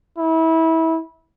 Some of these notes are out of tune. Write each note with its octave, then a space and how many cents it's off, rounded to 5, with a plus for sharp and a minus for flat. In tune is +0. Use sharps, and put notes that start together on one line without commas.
E4 -25